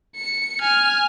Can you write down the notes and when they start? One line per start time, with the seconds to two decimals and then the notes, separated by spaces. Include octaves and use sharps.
0.16 C#7
0.61 G#5 F6